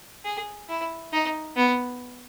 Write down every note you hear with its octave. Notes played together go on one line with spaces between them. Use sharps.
G#4
E4
D#4
B3